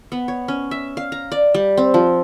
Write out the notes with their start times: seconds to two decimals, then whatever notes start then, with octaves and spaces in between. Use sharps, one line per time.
0.12 B3
0.28 C#5
0.48 C#4
0.71 E5
0.97 F5
1.12 A#5
1.32 D5
1.54 G3
1.77 C4
1.94 F3